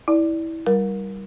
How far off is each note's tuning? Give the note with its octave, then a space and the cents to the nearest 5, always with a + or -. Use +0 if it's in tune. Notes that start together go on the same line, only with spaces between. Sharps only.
E4 -20 D5 +0
G3 -10 A#4 +15